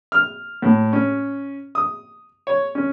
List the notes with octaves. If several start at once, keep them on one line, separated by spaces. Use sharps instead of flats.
F6
A2
C#4
D#6
C#5
C#4